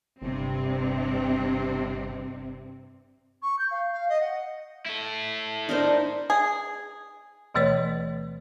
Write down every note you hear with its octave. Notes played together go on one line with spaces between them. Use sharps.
G1 G2 C3 C4
C#6
G6
F5
F5
D#5
F#5
E4 A4
D4 D#4 A#4 C5
G#4
D2 B2 E3 A3 B4 C#5